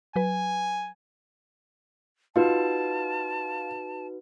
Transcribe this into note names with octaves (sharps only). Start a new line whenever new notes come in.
F#3 B4 G#5
D#4 F4 F#4 B4 A5